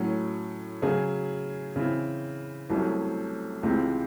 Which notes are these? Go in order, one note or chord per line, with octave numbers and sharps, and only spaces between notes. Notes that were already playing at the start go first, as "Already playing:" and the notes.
Already playing: A2 F#3 C#4
C#3 F#3 C#4 G#4
C#3 E3 C4 E4
C2 C3 F#3 A3 C#4
C#2 C3 E3 G#3 C4